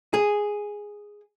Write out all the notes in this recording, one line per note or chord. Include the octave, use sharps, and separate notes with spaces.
G#4